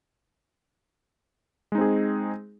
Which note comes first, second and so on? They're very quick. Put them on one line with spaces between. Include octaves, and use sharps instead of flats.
G#3 D#4 C4 G#4